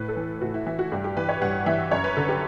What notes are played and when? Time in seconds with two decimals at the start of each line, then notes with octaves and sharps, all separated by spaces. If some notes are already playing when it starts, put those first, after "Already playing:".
Already playing: A2 B4
0.08 A4
0.16 E3
0.41 A2 F#4
0.54 E4
0.66 E3 E4
0.79 F#4
0.92 G2 G4
1.04 G4
1.17 E3 B4
1.29 C#5
1.42 G2 F#5
1.66 E3 E5
1.91 F#2 C#5
2.04 B4
2.17 D3 A4
2.29 G4